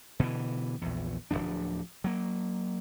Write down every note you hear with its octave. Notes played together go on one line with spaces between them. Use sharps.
B2 D3 E3
A#1 E2
D1 D#2 F3 D4
F#3 A#3